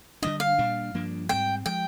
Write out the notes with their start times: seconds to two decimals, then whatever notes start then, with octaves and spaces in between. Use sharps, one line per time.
0.22 D3 G3 D4 D#5
0.40 F5
0.58 A#2 G3 D4
0.94 G2 F3 A#3 D4
1.29 G#2 G3 C4 G5
1.66 F3 G#3 G5